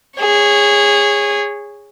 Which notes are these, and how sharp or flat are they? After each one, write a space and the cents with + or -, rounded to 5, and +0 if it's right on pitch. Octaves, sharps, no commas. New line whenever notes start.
G#4 -20 C#5 +0